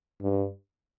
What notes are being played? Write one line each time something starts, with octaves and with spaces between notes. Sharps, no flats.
G2